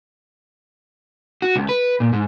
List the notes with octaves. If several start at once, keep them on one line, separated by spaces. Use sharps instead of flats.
F#4
C#2
B4
A#2
G#2